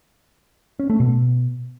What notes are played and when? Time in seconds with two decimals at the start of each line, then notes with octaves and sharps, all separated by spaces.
0.79 C#4
0.90 A3
1.00 B2